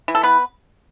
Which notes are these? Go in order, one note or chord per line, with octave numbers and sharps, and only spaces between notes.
E3
A4
B3 B4